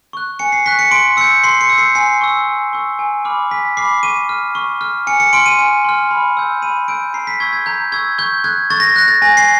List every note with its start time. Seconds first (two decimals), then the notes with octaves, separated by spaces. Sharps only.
0.13 C#6 F#6
0.39 G#5 C#7
0.52 C7
0.66 C#6 F#6 B6
0.79 C#7
0.91 C6 D7
1.17 E6 G6 C#7
1.44 C6 C7
1.61 C#7
1.70 E6 G6
1.78 C7
1.95 G#5 C7
2.21 C#6 E6
2.47 G#5
2.73 C#6 E6
2.99 G#5
3.25 B5 D6 F6
3.51 G#5 B6
3.77 B5 D6 F6 C7
4.03 C#6 D#7
4.29 F6
4.55 C#6
4.81 F6
5.07 G#5 C#7
5.20 C#7
5.33 C6 F6 D7
5.46 D#7
5.59 G#5
5.85 C6 F6
6.11 B5
6.37 E6 G6
6.62 B5 D#7
6.88 E6 G6 D7
7.14 A#5 C7
7.27 B6
7.40 C#6 E6 G6 G#6
7.53 G#6
7.66 A#5 G6
7.92 C#6 E6 G6 G#6
8.18 C#6 G6
8.44 F#6 G#6
8.70 C#6 A6
8.80 A#6
8.89 A6
8.96 F#6 A#6
9.08 A6
9.22 G#5 A#6
9.37 C7